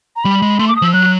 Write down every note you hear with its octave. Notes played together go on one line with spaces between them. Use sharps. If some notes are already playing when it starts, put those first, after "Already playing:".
A#5
G3 B5
G#3
A3 C6
D6
D#6
F3 E6
F#3 F#6